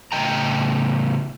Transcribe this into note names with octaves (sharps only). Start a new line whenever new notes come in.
A2 C#3 D#5 G5 A#5